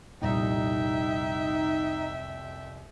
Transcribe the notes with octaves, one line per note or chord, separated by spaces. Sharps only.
C2 F2 A#2 G3 D#4 E5 G5